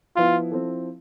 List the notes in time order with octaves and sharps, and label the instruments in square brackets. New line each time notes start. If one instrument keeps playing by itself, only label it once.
[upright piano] F3 B3 E4 B4 [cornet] F4
[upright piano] F3 C4 E4 A4